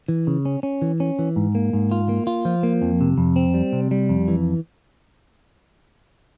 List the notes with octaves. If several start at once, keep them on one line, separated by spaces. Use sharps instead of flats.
E3
C#3
C#4
C#4
E3
C#4
E3
G#2
A#3
G#2
F4
A#3
F4
F3
A#3
F2
C3
F2
C4
G3
C3
G3
F2
E3